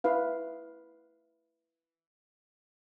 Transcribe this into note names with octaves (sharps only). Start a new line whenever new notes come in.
E4 B4 F5